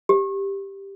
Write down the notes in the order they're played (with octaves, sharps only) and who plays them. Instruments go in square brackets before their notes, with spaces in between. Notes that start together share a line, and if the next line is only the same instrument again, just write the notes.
[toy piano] G4